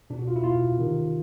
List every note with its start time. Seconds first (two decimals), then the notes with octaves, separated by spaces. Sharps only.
0.10 B2 D4
0.19 F#4
0.28 F4
0.36 E4
0.44 B2 F4
0.78 C3 D#3